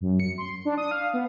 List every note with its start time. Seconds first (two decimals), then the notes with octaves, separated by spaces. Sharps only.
0.01 F#2
0.20 C#7
0.38 C6
0.65 D4
0.78 D#6
0.91 F5
1.14 B3